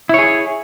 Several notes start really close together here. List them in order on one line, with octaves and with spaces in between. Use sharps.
E4 C#5 G#4